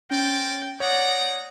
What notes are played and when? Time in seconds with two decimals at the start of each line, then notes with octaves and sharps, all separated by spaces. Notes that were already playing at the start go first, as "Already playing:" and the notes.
0.11 C#4 A#4 C5 D5 G5
0.80 A#3 D#4 C#5 D5 F#5 A#5 D#6